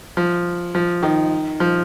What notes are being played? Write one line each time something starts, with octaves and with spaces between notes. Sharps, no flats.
F3
F3
D#3
F3